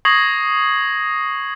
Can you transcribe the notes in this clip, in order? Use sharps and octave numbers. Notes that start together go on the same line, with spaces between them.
C#6 D#6 G#6 A#6 C7 F#7